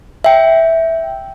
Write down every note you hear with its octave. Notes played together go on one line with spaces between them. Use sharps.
E5 G5